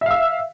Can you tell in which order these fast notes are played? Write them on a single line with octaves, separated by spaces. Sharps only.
E5 F5 E6